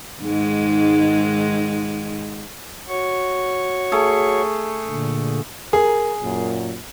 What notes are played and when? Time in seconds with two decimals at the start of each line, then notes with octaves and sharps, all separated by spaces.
0.22 G#2 D#3 G#3
2.88 F#4 C#5 C#6
3.92 A3 G#4
4.87 A#2 D3
5.73 G#4 A#4
6.22 F#2 A#2